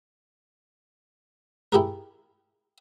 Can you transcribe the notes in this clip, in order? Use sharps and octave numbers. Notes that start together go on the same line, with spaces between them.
E4 G4 G#4 A#4